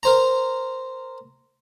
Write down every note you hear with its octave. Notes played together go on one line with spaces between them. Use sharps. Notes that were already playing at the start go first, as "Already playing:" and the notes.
A#4 C5 A#5